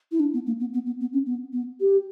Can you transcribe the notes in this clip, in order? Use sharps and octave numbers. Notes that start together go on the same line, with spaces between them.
E4
D4
B3
A#3
B3
B3
B3
B3
C#4
B3
B3
G4